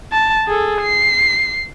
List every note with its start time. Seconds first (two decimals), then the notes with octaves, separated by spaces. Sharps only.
0.12 A5
0.48 G#4 A4
0.82 C7